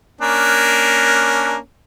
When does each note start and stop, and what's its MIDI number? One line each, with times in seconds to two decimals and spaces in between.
0.21 1.56 58
0.21 1.56 61
0.21 1.56 62